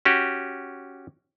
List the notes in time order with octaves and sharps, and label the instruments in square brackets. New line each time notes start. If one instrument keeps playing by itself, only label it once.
[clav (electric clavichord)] C#4 F#4 G4